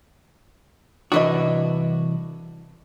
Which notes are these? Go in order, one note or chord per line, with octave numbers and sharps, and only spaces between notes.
C2 E3 D4 F#4 D#5